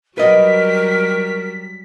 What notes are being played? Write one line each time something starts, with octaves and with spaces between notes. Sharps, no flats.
F#3 G3 A#4 B4 D#5 B6